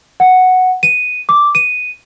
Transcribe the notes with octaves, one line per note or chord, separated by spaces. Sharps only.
F#5
D#7
D6
D#7